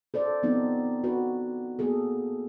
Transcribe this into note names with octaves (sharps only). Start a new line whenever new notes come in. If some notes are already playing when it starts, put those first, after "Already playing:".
A4 C5 D5
F3 B3 C4 D#4
F#4 B4
A#3 B3 G#4 A4